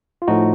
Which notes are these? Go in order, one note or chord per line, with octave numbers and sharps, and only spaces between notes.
F4
A2 F3 A3 D#4 F#4